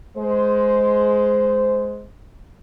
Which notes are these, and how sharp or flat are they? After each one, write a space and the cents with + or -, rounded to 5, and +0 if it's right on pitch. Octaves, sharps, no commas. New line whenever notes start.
G#3 +15 C5 -15